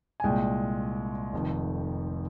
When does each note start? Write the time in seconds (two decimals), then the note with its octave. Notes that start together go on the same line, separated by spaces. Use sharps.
0.20 G#5
0.23 C2 A#2 G#3 G5
1.33 F1 F2 D#3